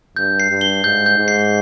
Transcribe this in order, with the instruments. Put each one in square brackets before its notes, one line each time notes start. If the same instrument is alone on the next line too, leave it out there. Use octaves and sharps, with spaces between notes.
[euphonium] G2 [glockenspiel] G6
[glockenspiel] C7
[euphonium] G2
[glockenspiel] G7
[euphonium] G#2 [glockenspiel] G6
[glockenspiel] G6
[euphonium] G#2
[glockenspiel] C7